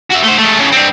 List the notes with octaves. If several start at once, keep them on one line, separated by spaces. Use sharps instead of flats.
F#4 E5
A3 C5
G#3 A3
A2 C#3
G2 C4